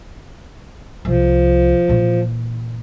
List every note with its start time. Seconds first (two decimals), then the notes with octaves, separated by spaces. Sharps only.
1.05 C2 F3
1.88 A#2 E3